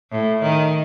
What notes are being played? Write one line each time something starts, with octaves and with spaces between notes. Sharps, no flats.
A2
D#3